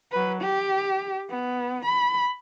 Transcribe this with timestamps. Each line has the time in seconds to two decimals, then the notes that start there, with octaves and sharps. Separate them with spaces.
0.12 F#3 B4
0.42 G4
1.30 B3
1.86 B5